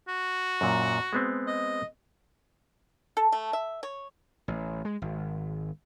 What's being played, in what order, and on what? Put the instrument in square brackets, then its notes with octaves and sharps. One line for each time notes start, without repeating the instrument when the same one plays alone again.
[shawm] F#4
[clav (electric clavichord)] F#2 A#2
G#3 B3 C4
[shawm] D#5
[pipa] A4
A3
E5
C#5
[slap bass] A1
G#3
G#1